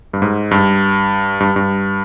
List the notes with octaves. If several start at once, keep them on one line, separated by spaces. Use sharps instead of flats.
G2
G#2
G2
G2
G2